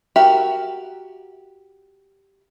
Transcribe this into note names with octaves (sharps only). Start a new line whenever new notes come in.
F#4 G4 A#4 E5